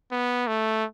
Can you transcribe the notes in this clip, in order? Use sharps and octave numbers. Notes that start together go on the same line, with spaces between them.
B3
A3